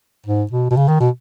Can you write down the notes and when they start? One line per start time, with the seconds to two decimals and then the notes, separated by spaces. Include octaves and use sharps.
0.26 G#2
0.51 B2
0.70 B2
0.77 C#3
0.88 D#3
1.00 B2